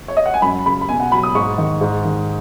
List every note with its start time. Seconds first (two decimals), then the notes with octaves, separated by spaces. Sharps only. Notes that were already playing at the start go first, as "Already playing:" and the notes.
0.08 C#5
0.17 D#5
0.26 F#5
0.34 G#5
0.42 F#2 B5
0.65 C#3 B5
0.81 B5
0.89 B2 G#5
1.00 F#5
1.12 F#3 B5
1.23 D#6
1.35 G#2 C#6
1.58 D#3
1.81 G#2
2.05 D#3